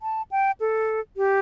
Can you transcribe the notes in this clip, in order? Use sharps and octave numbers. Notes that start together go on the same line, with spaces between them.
A5
G5
A4
G4